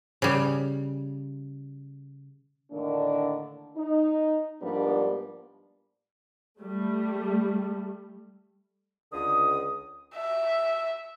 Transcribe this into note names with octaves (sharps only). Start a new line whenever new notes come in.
C#3 G3
A2 D3 D#3 A#3 D4
D#4
G#2 F3 G3 A#3 B3 D4
G3 A3
C#2 D3 D#6
E5